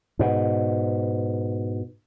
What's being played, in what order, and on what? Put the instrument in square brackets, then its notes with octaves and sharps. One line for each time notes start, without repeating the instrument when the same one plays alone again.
[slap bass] G#2 B2